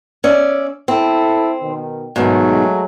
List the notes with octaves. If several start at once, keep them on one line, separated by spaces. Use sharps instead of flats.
C#4 D5 E5
C4 E4 A4
B2 D#3
G#2 B2 D#3 F#3 G#3 A3